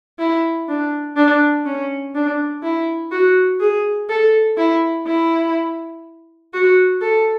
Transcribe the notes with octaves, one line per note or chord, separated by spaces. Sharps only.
E4
D4
D4
C#4
D4
E4
F#4
G#4
A4
E4
E4
F#4
A4